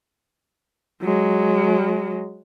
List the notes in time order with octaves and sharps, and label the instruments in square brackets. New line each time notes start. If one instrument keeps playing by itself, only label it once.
[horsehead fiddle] F#3 G#3